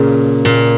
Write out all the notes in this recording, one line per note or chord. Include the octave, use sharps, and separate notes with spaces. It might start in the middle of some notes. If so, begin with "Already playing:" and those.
Already playing: A#2 C#3
A#2